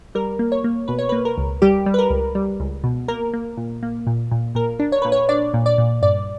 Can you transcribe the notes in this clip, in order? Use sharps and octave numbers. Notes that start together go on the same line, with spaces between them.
G3 A#4
A#3
C#5
A#3
B2 B4
C#5
B4
A#3
A#4
C#2
G3 G4
G3
B4
A#4
C#2
G3
C#2
B2
A#3 A#4
A#3
A#2
A#3
A#2
A#2
A#2 A#4
D4
C#5
A#2 B4
C#5
D4 D5
A#2
D5
A#2
G2 D5